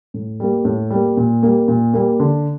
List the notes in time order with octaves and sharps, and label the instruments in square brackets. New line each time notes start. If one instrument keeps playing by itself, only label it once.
[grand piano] A2
G3 A#3
A2
G3 A#3
A#2
G3 A#3
A#2
G3 A#3
D3